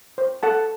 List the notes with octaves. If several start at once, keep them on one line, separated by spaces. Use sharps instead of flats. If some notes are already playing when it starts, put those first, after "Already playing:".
C5
A4 F#5 A5